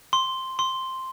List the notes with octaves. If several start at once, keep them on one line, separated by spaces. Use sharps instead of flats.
C6
C6